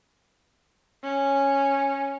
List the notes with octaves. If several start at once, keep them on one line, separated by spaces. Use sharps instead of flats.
C#4